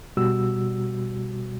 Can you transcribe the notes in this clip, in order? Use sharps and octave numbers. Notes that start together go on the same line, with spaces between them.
B2 G3 F#4 E6